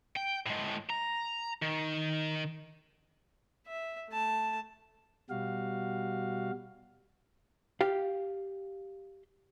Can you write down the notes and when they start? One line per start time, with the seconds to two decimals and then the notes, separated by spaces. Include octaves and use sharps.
0.16 G5
0.46 A2 G#3
0.90 A#5
1.62 D#3
3.67 E5
4.09 A3 A5
5.30 B2 G3 F#4 F5
7.81 G4 F5